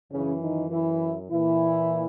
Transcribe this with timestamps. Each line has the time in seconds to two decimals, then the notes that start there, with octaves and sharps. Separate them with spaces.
0.11 F#2 C#3 E3 C#4
0.41 D#3 D#4
0.71 E3 E4
1.30 A#2 E3 E4